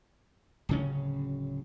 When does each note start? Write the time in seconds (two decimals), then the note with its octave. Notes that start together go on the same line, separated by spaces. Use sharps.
0.69 D1 C#3 C#4